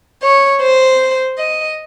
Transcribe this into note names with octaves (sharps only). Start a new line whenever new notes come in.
C#5
C5
D#5